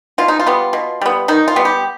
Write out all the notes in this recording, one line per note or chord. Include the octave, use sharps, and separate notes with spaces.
B2 F4
D#4
F4
G3 B3
B2
G3 B3
D#3 D#4
F4
G3 B3
G4